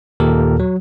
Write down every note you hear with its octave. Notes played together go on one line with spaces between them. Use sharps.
D#2 A#2 G4 A4 A#4
F#3